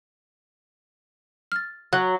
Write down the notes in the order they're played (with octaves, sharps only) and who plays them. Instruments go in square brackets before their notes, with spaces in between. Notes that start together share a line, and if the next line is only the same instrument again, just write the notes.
[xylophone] F6 A6
[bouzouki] F#3 [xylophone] F#6